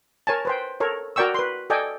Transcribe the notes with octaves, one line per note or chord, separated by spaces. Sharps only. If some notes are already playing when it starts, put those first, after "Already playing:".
A#4 C#5 G#5 A5
B4 C5 G5
A4 A#4 C#5
F#4 A#4 D5 G5 C#6 E6
B4 C6
A4 D5 D#5 G5 G#5